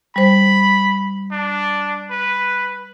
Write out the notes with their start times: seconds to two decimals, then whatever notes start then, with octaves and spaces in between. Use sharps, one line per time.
0.16 G3 C5 B5
1.32 D4
2.11 B4